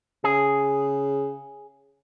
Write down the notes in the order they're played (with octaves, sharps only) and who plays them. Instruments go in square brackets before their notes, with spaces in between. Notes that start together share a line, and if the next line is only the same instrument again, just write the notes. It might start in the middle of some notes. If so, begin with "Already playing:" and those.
[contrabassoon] C#3 [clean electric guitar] G#4